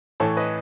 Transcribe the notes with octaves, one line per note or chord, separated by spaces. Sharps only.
A2 E3 A4 C#5
B4 D#5